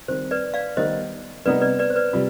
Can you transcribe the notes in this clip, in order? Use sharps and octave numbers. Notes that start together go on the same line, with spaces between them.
D#3 G3 C4 C5
B4 D5
D5 F5
D#3 G3 B3 C5 D#5
C3 G3 B3 D#4 B4 D5
B4 D5
B4 D5
C5
B4 D5
C3 G3 F4